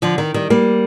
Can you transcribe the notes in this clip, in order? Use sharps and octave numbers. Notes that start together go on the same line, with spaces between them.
D3 F3
D#3
D#3 G3
G3 A#3